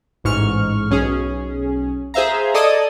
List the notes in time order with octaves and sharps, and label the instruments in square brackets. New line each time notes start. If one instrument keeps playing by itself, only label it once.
[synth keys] A1 G#2 C#6 F6
B1 C#4 G#4
G#4 C5 E5 F5 A#5
A4 D5 D#5 A5 D#6 G#6